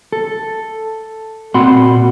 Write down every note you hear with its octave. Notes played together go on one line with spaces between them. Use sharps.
A4
A#2 C4 F#4 F#5 B5 C6